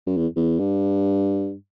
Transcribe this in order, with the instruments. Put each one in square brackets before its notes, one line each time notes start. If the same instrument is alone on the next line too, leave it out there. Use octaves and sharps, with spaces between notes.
[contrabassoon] F#2
E2
E2
G2